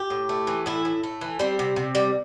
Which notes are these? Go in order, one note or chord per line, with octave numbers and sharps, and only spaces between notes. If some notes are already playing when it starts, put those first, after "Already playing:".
Already playing: G4
A2
A3
E3
A2 E4
A2
A3
E3
G3 C4
C3
C3
G3